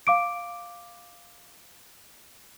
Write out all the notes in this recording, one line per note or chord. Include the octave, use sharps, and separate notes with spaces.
F5 D6 D7